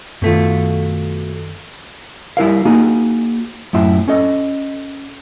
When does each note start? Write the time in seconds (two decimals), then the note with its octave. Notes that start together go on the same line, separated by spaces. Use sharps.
0.22 F#2 B2 D#3 A3 F4
2.37 G3 E4 A#4 F5
2.65 A#3 D#4 F#4 G#4
3.73 F#2 A2 E4 C6
4.08 C#4 A4 D#5